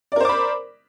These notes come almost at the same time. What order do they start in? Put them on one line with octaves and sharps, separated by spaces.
D5 A#4 C5 D6 B5